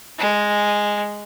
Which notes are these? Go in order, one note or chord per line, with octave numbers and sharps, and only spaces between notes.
G#3